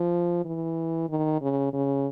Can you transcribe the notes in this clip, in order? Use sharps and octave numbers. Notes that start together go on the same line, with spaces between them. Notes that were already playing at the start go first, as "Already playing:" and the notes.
Already playing: F3
E3
D#3
C#3
C#3